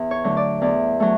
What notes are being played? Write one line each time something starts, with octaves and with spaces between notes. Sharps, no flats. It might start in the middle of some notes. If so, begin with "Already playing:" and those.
Already playing: E2
C#5
D3 F#3 A3
D5
E2 D5
F#3 A3